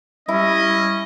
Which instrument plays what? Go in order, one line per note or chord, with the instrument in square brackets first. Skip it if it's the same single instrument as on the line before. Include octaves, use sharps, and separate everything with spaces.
[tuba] G3 [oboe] C#4 [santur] E4 [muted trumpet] D#5